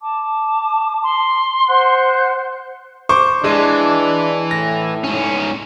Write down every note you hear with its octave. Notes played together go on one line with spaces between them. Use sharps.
A5 D6
C6
C5 F#5 F#6
C5 C#6 D6
E3 G#3 D4
A2 A#6
G#2 C#4